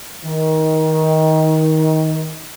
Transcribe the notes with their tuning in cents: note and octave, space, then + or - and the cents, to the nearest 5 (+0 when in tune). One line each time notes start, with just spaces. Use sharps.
D#3 +20